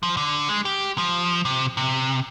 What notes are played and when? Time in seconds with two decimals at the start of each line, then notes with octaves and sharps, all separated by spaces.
0.03 F3
0.17 D3
0.49 G#3
0.65 G4
0.98 F3
1.45 C3
1.77 C3